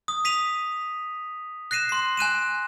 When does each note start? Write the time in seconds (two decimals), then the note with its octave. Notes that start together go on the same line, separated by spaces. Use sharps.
0.08 D#6
0.25 B6 D#7 F7
1.71 F#6 A#6 C7 D#7 E7
1.89 C6 C7
2.17 G#5 F#6 D#7 E7